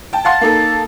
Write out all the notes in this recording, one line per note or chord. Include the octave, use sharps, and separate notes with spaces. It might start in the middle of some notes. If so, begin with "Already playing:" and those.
G5 A5
F5 F#5 A5 C6
A#3 D#4 A4